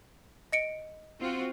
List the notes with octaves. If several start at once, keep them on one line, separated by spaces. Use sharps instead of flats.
D#5 C#7 D7
C4 F4 F#4